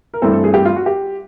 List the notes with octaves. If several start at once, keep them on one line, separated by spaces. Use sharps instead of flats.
A#4
G2 E3 A3 C4 A4
A4
G#4
G4
F4
F#4
G4